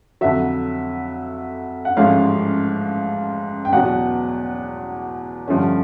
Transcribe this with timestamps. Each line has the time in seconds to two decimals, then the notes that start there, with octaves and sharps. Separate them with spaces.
0.21 F2 D3 F#3 E5
1.85 F#5
1.96 A1 G#2 F3 A3 C#4 F5
3.65 G5
3.72 E2 B2 F#3 F#5
5.48 G2 D3 F3 A3 C#4